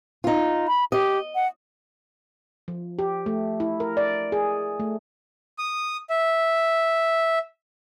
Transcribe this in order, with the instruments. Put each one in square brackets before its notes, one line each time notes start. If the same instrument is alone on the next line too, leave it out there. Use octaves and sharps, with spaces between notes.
[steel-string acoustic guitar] D#4 F4
[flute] B5
[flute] G4 [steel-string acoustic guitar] D#5
[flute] F#5
[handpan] F3
G4
A3
E4
A#4
D5
G#4
A3
[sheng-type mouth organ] D#6
E5